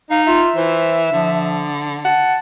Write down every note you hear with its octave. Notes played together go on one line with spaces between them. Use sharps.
D#4 F5
F4 E5
E3 C5
D3 F3
F#5 A5